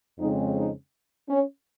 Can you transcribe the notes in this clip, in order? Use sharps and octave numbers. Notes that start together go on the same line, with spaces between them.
F2 C#3 G#3 C4 D#4
D#4
C#4